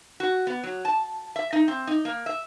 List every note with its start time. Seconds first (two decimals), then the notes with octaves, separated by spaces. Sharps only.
0.20 F#4
0.47 B3
0.63 F#3
0.85 A5
1.36 E5
1.53 D#4
1.68 C4
1.87 D#4
2.05 A#3
2.26 E5